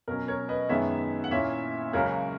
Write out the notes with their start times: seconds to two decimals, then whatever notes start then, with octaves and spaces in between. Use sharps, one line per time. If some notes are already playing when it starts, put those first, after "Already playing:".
0.08 B2 F#3 C#4 A#4
0.28 A#4 C#5
0.49 B4 D#5
0.69 F#2 D#3 G#3 B3 C#5 E5
1.24 F#5
1.31 A#2 A#3 C#4 E4 C#5 E5
1.93 C#2 C#3 F#3 A#4 C#5